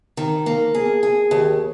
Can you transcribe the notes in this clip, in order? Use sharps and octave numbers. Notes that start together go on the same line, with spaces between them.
D#3
A#3
G#4
G#4
D#2